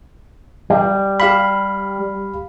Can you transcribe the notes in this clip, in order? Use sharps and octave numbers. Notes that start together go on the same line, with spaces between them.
G3
G4 F5 B5